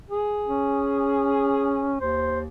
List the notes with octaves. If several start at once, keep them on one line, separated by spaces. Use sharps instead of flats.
G#4
C#4
D#2 C5